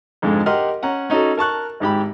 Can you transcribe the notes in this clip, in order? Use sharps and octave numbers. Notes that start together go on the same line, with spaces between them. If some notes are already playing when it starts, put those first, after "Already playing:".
F2 G#2 D3 G#3
G4 A#4 D#5 F#5 C6 F6
C#4 F#5 A#5
C#4 D#4 F#4 A4
A#4 A5 C#6 F#6
G#1 G#2 G4 B5